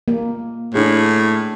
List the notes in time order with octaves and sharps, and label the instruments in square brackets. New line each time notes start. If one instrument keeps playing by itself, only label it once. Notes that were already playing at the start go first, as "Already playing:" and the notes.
[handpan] A#3
[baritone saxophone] A2 [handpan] D4 G#4